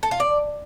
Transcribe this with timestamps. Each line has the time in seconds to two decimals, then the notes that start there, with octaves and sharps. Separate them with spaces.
0.03 A4
0.11 F4
0.20 D5